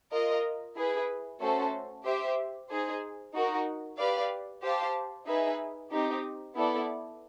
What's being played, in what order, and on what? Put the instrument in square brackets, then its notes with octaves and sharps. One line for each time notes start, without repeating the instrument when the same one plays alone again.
[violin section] F4 A#4 D#5
E4 G#4 B4
A3 C#4 F#4 A4 C5
G4 C5 E5
D#4 G#4 C5
D#4 F#4 A#4
G4 B4 D5 F5
G4 C5 F5 A5
D#4 G#4 B4 E5
C4 D#4 G4
B3 E4 A4 D5